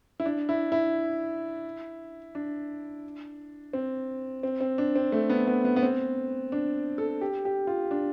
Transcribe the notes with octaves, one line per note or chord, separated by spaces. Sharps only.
E4
D4
E4
E4
D4
C4
C4
C4
D4
C4
A3
B3
B3
B3
B3
C4
D4
A4
G4
G4
F4
D4